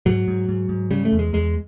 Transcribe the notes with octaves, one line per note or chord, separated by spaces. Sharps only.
G#2 F#3
G#2
G#2
G#2
C#3 G3
A3
E2
G#3
E2 G#3